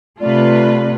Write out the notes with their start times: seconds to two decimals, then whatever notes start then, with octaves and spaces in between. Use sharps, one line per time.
0.20 C3 A3 F4 B4 D5